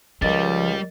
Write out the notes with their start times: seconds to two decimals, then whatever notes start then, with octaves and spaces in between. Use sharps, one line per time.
0.22 C#2 F3 G3 A#4 D#5 A6